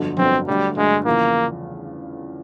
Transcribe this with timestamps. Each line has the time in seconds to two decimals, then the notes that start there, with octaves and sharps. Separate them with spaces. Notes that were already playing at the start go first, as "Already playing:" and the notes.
Already playing: G1 F2 D3 F#3
0.18 G1 F2 D3 F#3 C4
0.47 G2 D3 F#3 G3 A3
0.76 G2 D3 F#3 G#3 A3
1.05 E2 C#3 F3 A#3